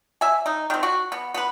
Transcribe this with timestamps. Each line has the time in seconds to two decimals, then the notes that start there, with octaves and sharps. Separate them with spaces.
0.21 E5 G#5
0.46 D#4
0.70 D#3 C4
0.83 F#4
1.12 B3
1.34 B3 B4